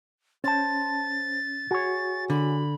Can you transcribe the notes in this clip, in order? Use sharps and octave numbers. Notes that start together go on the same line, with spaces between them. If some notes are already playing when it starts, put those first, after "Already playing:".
C#4 C5 A5 A6
F#4 G#4 C#5
D3 B5